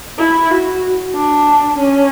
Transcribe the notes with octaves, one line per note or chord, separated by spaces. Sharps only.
E4
F#4
D4
C#4